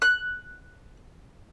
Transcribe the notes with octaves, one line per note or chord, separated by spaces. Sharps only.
F#6